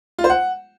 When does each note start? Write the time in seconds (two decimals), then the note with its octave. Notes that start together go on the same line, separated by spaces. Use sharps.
0.19 F4
0.24 C5
0.30 F#5